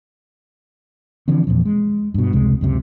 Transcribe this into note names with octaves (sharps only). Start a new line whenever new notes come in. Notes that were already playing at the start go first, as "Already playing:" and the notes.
D3 E3 F3 C4
E2 A#2 F3
G#3
G2 B2
F1 C#2 C3 G#3
C#2 F#2 C3